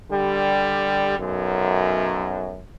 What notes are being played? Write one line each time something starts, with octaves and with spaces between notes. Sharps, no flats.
D3 G3
B1 F#2